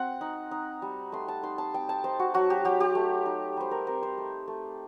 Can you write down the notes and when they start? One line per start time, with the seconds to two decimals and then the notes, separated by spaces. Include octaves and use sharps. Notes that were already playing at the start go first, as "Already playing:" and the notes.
Already playing: C4 F#5
0.21 D#4
0.51 D#4
0.82 G3
1.12 A3 C6
1.28 A5
1.43 D#4 C6
1.58 A5
1.74 C4 G5
1.89 A5
2.04 D#4 C5
2.19 F#4
2.34 F#3 F#4
2.50 G4
2.65 F#3 G4
2.80 G4
2.95 A3
3.26 D#4
3.57 G3 C5
3.71 A#4
3.87 C4 A#4
4.03 C5
4.18 A3
4.48 A3